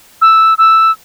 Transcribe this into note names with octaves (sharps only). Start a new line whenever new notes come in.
E6
E6